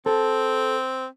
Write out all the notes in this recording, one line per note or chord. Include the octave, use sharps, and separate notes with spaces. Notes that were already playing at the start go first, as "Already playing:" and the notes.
C4 A4